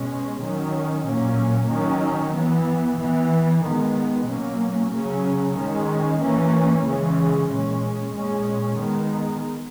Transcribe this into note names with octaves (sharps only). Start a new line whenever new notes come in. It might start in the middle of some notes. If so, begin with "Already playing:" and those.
Already playing: B2 G#3 C#4
D#3 F#3 C#4
A#2 F#3 A#3 C#4
D#3 F#3 C#4
E3 B3
E3 B3
D#3 G#3 B3
B2 F#3 A#3 C#4
C#3 F#3 C#4
D#3 G#3 C#4
E3 A#3 C#4
C#3 E3 G#3 C#4
A#2 G#3 C#4
A#2 G#3 C#4
D#3 G#3 B3